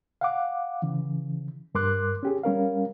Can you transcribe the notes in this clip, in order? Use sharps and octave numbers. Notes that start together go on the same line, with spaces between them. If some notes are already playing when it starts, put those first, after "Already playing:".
F5 F#5 D6
C#3 E3
G2 A#4 C6 D6 F#6
C#4 G4 G#4
G3 C#4 A#4 F5